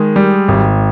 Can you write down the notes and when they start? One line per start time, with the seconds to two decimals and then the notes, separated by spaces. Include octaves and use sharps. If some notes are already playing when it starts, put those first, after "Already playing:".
Already playing: D#3 G#3
0.16 G3
0.48 G#1